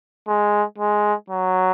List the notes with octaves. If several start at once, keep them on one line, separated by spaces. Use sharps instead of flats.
G#3
G#3
F#3